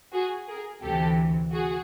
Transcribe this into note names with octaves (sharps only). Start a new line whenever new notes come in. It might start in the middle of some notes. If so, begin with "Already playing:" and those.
F#4 G#4
G#4 A#4
D2 C3 E3 G4 A4
F#4 G#4